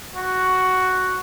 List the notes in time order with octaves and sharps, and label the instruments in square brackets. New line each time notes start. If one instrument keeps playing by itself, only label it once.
[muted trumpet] F#4